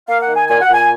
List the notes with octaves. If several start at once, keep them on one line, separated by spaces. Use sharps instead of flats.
A#3 F5
F#5
D#3
G#5
A#2 G#5
F#5
A#2 G#5